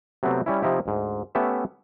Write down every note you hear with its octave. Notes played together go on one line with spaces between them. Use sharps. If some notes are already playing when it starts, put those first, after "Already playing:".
C3 F#3 A3 B3 C4
G3 C#4 E4
C3 F3 D#4 E4 G4
D2 G#2
A3 B3 C#4 G4 E5